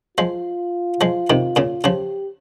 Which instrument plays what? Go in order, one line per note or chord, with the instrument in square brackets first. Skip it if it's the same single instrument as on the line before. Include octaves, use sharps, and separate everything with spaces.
[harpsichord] F3 G#3 [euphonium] F4
[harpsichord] F3 G#3
C3 D#3
A#2 C#3
[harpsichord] C#3 F3 [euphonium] G4